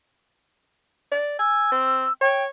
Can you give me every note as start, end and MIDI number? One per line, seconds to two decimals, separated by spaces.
1.12 1.38 74
1.39 1.71 80
1.39 2.13 88
1.72 2.06 60
2.21 2.47 73
2.21 2.43 79